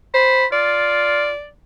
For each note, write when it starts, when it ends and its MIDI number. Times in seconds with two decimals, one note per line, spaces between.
0.14 0.46 72
0.14 0.46 83
0.52 1.30 65
0.52 1.48 74